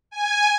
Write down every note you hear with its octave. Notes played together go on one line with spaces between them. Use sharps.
G#5